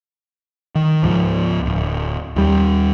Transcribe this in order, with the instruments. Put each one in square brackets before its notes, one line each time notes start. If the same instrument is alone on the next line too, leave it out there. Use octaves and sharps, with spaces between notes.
[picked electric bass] D#3
C#2 G#2 F3
D1
D#2 G3